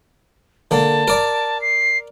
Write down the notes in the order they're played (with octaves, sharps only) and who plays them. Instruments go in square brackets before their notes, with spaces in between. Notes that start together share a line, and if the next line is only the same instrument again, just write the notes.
[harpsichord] D3 A#3 [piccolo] A5
[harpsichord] A#4 D5
[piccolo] C7